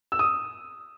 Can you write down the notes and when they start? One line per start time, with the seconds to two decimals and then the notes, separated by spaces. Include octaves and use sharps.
0.12 E6
0.19 D#6